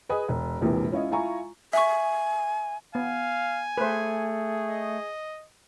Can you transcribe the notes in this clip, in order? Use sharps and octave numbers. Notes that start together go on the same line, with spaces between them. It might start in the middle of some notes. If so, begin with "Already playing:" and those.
G#4 B4 D#5 G#5 D#6
E1
E1 A#1 E2 C3 E3
C#4 E4 F4 C#5 D#5
E4 F4 G#5 A#5 C#6
E5 G#5 C#6
B3 F5 G#5
A3 G#4 B4 C5
D#5